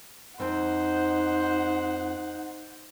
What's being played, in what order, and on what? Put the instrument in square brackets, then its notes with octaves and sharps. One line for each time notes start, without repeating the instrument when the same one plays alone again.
[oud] F2 C4 [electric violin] D#4 F#5 [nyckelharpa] C5